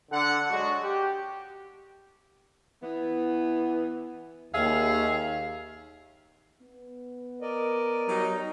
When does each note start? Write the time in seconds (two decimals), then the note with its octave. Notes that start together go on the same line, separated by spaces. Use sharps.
0.12 D3 F#5
0.50 F#3 G#3 D4 F#4
0.83 G4
2.83 E3 B3
4.54 D#2 G#4 E5 F5
6.62 B3
7.42 A#4 D5 D#5
8.08 F#3 G3 D#4